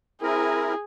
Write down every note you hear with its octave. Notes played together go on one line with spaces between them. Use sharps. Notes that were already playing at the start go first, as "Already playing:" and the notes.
C4 E4 G#4 A#4